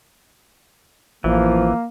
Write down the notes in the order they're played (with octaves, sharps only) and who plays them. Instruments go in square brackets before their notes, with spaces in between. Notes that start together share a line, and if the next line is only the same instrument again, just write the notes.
[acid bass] A1 [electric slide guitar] E3 [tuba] F3 [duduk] A#3